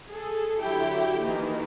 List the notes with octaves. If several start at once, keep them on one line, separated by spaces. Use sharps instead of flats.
G#4 A4
D3 F#3 E4 G4 G5
D#3 E3 A#3